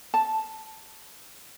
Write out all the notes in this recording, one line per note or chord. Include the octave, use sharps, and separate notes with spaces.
A5